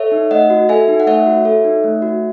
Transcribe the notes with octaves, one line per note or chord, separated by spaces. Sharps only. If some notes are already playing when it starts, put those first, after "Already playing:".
Already playing: A4 C#5 E5
D#4
A3 D#5 F#5
F#4
A4 E5 G#5
D#4
F#5
A3 C#5 E5
F#4
A4
D#4
A3
F#4